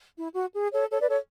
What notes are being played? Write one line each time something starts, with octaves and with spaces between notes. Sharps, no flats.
E4
F#4
G#4
A4 C#5
A4 C#5
B4 D5
A4 C#5